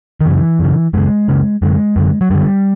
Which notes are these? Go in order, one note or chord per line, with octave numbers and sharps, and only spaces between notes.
D#3
F#2 C#3 E3
F#2 C#3
F#2 C#3 G#3
F#2 C#3
F#2 D3 G#3
F#2 D3
F#3
F#2 D3 G3